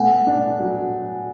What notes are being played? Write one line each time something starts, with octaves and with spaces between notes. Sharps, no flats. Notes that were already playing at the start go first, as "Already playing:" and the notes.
Already playing: A3 B3 F#5 G#5
D4
F#3